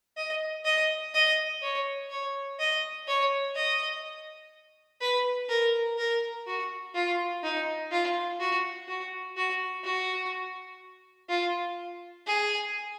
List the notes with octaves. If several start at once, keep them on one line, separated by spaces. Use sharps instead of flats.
D#5
D#5
D#5
C#5
C#5
D#5
C#5
D#5
B4
A#4
A#4
F#4
F4
D#4
F4
F#4
F#4
F#4
F#4
F4
G#4